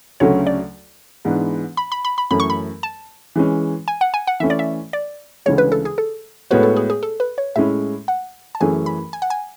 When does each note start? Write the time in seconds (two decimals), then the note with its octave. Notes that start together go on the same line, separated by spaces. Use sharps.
0.20 D2 C#3 F#3 A3 C#4 C#5
0.47 D5
1.25 G#2 E3 B3 D4
1.77 B5
1.92 B5
2.05 B5
2.18 B5
2.31 F#2 E3 A3 C#4 B5
2.40 C#6
2.50 B5
2.83 A5
3.36 E3 G#3 C#4
3.88 G#5
4.01 F#5
4.14 G#5
4.27 F#5
4.40 E3 A3 C#4 E5
4.50 D5
4.59 E5
4.93 D5
5.46 D2 C#3 E3 G#3 C#5
5.58 B4
5.72 A4
5.85 G#4
5.98 A4
6.51 A2 G#3 B3 F#4 B4 C#5
6.63 A4
6.76 G#4
6.90 G#4
7.03 A4
7.20 B4
7.38 C#5
7.56 A2 G#3 C#4 E4 E5
8.08 F#5
8.55 A5
8.60 F#2 E3 A3 C#4 G#4 G#5
8.86 B5
9.13 G#5
9.22 F#5
9.30 G#5